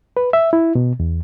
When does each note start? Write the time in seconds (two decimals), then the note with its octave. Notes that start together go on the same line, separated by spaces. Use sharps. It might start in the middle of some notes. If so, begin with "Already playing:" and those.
0.17 B4
0.33 E5
0.53 E4
0.75 B2
1.00 E2